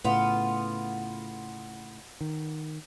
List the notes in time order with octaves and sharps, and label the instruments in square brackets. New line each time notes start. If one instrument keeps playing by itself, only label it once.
[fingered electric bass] A2 C#3 [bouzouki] B3 F4
[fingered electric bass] D#3